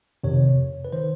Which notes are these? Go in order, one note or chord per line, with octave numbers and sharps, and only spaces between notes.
F2 C3 D#3 C#5
B4
D#3 C5